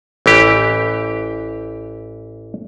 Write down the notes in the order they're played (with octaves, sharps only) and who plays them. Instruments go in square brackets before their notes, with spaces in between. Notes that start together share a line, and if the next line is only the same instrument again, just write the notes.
[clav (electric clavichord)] A1 E3 G4